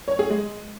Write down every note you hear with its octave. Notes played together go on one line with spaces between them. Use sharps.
C#5
G#4
G#3